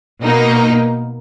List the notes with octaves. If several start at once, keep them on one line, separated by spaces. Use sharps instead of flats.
B2 A#3 D#4